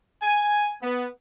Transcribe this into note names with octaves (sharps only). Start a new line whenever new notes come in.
G#5
B3